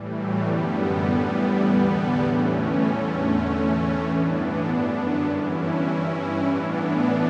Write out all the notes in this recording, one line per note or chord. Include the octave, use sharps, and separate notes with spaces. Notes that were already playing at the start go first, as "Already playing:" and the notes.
Already playing: A2 E3 G3
F#3 A3
F#2 D3 G3 B3
A2 E3
E2 D3
A2 E3 A3 C#4
E2 D3
A2 E3
G2 E3 B3 D4
F#2 D3
G2 E3 C#4 E4
G2 E3
A2 E3 B3 D4